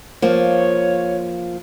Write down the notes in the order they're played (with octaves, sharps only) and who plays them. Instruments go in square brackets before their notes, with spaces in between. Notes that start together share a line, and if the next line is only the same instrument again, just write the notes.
[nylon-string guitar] F3 A#3 [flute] C#5